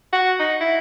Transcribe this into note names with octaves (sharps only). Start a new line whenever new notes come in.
F#4
D#4
E4